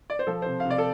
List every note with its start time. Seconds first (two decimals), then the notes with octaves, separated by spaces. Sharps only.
0.10 D5
0.19 C5
0.27 F3 A4
0.42 C3 C5
0.60 F5
0.65 C3
0.70 D5
0.78 A4